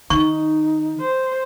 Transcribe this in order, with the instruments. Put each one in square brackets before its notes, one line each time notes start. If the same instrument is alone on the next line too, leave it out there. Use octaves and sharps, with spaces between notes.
[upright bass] D#3 [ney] D#4 [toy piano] C#6
[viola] C5